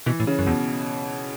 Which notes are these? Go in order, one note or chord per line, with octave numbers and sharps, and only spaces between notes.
B2 E3
A2
C#3
F#2
E2 B2